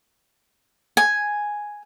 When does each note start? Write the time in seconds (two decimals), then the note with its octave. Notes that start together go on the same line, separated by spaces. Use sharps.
0.97 G#5